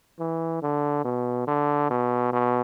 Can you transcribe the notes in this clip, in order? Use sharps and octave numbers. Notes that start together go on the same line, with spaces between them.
E3
D3
B2
D3
B2
B2